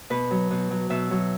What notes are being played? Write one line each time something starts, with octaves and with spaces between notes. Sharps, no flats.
B2 B4
F#3
B2
F#3
B2 E5
F#3